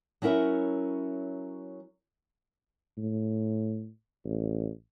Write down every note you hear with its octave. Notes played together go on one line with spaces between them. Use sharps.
F#3 C#4 E4 A#4 E5
A2
A1